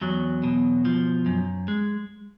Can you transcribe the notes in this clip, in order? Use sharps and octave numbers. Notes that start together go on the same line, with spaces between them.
E2 F#3
B2
F3
F#2
G#3